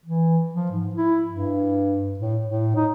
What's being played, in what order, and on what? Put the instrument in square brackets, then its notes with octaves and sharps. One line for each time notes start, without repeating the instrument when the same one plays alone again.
[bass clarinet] E3
F3
G#2
E4
G2
A2
A2
D#4